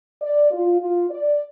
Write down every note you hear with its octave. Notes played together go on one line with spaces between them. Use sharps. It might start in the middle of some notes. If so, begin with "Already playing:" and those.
D5
F4
F4
D5